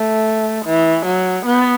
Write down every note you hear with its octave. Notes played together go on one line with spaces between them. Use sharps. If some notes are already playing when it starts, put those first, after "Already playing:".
Already playing: A3
E3
F#3
B3